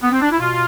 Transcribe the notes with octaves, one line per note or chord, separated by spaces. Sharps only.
B3
C4
D4
E4
B2 F4